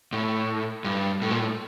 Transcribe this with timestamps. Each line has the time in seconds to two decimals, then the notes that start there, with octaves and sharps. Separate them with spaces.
0.12 A2
0.84 G2
1.22 A2
1.30 A#2
1.39 A2